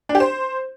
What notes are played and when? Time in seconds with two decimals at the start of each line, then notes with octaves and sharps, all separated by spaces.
0.09 D4
0.15 G4
0.20 C5